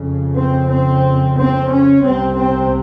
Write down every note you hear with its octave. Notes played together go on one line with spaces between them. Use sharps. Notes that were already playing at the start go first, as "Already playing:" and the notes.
Already playing: F2 C#3
C4
C4
C4
C#4
C2 C3 C4
C4